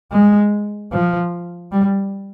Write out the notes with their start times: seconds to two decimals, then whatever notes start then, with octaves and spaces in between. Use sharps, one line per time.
0.12 G#3
0.92 F3
1.72 G3